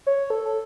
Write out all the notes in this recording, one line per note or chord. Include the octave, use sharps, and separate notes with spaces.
C#5
A4
A4